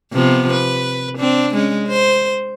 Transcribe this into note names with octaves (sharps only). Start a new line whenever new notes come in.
C3 F3 B3
B4
C4 D4
G#3 C#4
C5